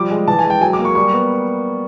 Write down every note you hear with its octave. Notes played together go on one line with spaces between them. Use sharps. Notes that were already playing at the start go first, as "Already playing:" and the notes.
Already playing: F3 G3 D6
G#3
E3 A5
G#5
G#3
G5
F#3 G#5
D6
A#3
C#6
G3 C#6
B3